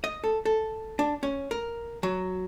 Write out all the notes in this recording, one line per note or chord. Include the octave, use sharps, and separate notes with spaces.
D#5
A4
A4
D4
C#4
A#4
F#3